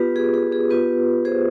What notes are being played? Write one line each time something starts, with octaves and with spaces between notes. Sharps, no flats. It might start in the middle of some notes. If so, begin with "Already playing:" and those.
Already playing: B3 F4 G4 B4
G#4
G#4
G#4
B3 F4 G4 B4
G#4 C5